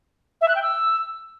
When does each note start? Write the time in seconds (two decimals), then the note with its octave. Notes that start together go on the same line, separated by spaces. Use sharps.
0.41 E5
0.48 F#6
0.55 G5
0.63 E6